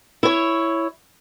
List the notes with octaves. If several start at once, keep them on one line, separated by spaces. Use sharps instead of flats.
E4 C#5